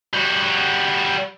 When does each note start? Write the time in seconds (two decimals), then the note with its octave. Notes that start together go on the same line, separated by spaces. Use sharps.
0.14 G3 F#4